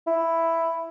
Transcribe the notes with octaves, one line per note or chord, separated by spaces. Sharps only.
E4